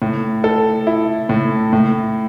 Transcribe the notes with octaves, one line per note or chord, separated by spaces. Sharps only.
A2
A4
E4
A2
A2